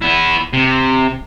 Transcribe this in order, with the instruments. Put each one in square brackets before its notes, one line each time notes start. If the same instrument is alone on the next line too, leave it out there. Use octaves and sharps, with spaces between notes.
[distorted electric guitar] B3 E4
C3